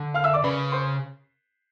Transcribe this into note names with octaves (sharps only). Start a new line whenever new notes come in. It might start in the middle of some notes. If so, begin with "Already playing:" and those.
Already playing: D3
F5 F6
E5 E6
D5 D6
C#3 B4 B5
C5 C6